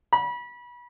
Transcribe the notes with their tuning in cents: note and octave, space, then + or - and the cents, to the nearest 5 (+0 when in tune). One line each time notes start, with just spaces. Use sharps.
B5 -30